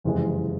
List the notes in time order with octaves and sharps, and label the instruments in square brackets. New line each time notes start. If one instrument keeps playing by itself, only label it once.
[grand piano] F#1 F2 C3 E3 G#3